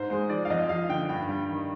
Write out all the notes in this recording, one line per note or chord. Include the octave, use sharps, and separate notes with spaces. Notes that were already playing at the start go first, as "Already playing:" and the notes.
Already playing: G#2 C5
G#3 C5
F3 D5
F5
F2 D#5
F3 F5
D3 G5
G2 G5
G3
D#3